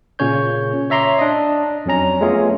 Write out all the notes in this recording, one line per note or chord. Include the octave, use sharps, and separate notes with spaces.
A#2 C#3 C#4 C#5 G6
C#5 E5 A#5 C6 D6
D4 D#5
F2 F#3 C#4 A#5
G#3 A3 B3 C#4 F4 G#4